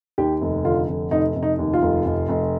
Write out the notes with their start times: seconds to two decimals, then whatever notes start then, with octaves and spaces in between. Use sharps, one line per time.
0.18 D#2 G4
0.41 F1
0.65 D3 F4
0.88 F1
1.11 F1 D#4
1.35 F1
1.43 D#4
1.59 D#2
1.73 F4
1.82 F1
2.05 F1
2.29 F1